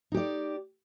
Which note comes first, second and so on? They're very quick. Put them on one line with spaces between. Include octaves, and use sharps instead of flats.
D#4 G4 D5